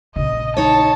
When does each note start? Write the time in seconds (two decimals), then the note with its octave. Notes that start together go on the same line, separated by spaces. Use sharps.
0.16 A#1 C#3 D#5
0.57 D#4 C#5 A5